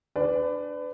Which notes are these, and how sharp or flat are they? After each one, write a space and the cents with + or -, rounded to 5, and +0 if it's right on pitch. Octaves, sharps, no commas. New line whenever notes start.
D4 +0 B4 +30 D5 +0